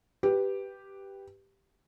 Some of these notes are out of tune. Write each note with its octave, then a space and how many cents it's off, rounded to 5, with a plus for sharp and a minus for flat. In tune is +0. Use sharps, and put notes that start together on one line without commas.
G4 +0 B4 +0